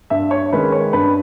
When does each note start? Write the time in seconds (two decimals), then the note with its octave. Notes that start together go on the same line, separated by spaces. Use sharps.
0.10 G2 E5
0.31 C#5
0.52 D#3 G#3 C#4 B4
0.72 C#5
0.93 G2 B4